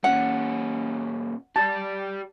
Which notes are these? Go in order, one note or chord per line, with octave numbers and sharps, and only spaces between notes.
A#2 C#4 F#5
G4 D5 A5